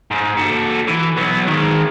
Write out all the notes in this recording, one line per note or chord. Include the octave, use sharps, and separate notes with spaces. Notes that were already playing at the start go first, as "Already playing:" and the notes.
G#2
F#4 A4
E3
F#3 B3
D#3 G#3